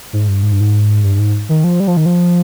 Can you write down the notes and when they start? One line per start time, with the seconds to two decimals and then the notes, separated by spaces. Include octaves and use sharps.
0.13 G#2
0.28 G2
0.43 G#2
0.52 G2
0.60 G#2
1.03 G2
1.15 G2
1.18 G#2
1.49 D#3
1.64 F3
1.80 G3
1.87 F3
1.97 D#3
2.06 F3